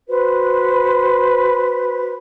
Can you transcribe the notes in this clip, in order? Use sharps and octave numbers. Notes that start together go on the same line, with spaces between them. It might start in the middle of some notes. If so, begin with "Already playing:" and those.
F#4 B4 C5